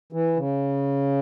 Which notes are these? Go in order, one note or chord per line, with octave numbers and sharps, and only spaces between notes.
E3
C#3